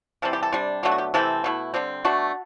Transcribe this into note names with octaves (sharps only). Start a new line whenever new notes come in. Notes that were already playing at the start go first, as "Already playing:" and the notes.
C3 E3 G3 C4 A4
G4
A4
C3 G3 D4
B2 F#3 A3 D4 G4
F#4
G4
C3 E3 A3 C4 A4
B2 A3 E4
D3 G3 C4
B2 A3 D4 F#4